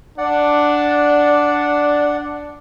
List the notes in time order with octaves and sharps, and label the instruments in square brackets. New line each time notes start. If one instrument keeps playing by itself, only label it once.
[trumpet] D4 [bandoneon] D5 F#5